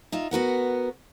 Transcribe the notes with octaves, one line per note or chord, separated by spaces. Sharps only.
D#4 F4 E5
B3 F#4 A#4 F#5